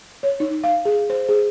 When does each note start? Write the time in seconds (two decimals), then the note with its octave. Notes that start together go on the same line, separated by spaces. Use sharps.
0.23 C#5
0.40 D#4
0.64 F5
0.85 G#4
1.10 C5
1.29 G#4